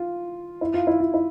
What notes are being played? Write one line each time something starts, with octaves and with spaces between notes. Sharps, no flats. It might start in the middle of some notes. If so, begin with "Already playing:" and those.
Already playing: F4
E4
F4
E4
F4
E4